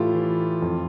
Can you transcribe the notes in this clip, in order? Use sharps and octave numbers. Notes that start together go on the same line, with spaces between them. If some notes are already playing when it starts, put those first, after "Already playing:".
Already playing: A2 E3 E4 F4 G4 A4
E3
F2